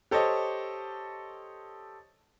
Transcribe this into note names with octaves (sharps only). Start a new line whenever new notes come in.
G4 A4 C5 C#5 D#5